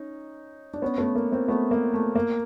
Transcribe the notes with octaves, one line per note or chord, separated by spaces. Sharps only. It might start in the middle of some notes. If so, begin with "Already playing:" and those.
Already playing: C#4 D#4
D4
B3 C#4
A3 B3
A#3
A#3 C4
A3 B3
A#3
A3
A#3